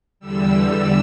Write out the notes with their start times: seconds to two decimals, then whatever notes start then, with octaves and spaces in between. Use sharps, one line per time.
0.20 E2 D3 G3 E6
0.53 E6